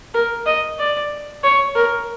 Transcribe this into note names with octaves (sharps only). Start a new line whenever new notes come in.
A#4
D#5
D5
C#5
A#4